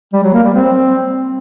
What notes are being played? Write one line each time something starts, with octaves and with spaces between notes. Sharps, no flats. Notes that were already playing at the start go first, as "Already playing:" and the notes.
G3
F#3
A#3
G3
C4